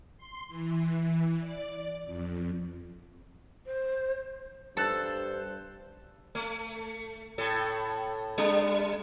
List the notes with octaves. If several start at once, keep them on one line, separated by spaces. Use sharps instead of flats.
C6
E3
D5
F2
C5
G2 A4 C5 A5 F#6 A6
A3
A2 A4
G3 D4